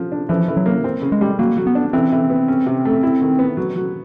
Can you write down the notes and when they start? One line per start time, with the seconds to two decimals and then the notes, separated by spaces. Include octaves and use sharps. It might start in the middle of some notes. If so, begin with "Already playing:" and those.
Already playing: F3
0.12 D4
0.29 E3 F3
0.48 E3
0.57 F#3
0.66 A#3
0.84 C4
1.02 C#3
1.12 G#3
1.21 G3
1.39 F#3 A#3
1.57 F#3
1.67 B3
1.75 D4
1.93 E3 C4
2.12 E3
2.30 B3
2.48 C#4
2.66 C3
2.85 A3
3.03 E4
3.22 D#3
3.39 B3
3.57 F#3
3.76 F#3